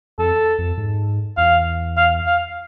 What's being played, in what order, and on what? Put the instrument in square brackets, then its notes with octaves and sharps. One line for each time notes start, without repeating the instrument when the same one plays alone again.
[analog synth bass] F2 [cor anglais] A4
[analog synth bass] F2
G#2
[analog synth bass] E2 [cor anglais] F5
[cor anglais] F5
F5